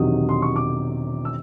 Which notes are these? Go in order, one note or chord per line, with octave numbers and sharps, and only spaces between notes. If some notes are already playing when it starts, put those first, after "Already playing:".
Already playing: E1 E2 C3 D#3 F#3 D#6
C6
C#6
D6
E6